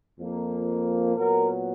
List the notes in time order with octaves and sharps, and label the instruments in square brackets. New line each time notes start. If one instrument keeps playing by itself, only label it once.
[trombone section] F2 F3 A#3
A#2 F#3 B3 A#4